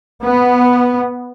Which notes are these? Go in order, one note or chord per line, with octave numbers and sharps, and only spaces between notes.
B3